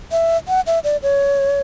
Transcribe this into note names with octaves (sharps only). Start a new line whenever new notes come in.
E5
F#5
E5
D5
C#5